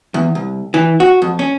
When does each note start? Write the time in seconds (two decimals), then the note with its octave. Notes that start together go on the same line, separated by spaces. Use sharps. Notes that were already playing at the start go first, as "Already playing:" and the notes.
0.14 E2
0.35 C2
0.74 E3
1.00 F#4
1.22 F2
1.39 C#4